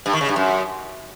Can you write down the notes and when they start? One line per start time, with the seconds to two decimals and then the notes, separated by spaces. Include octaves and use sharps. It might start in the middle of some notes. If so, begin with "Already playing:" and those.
0.06 G2
0.13 D#3
0.21 C#3
0.28 G2
0.36 F#2